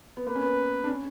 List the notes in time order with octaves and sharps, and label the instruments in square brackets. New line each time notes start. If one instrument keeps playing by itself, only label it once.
[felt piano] B3
[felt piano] A#3 [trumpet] B4
[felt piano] C#4
B3
D4
C#4